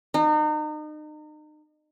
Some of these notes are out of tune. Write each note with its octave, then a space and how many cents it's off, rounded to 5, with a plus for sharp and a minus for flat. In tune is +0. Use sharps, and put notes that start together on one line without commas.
D#4 -35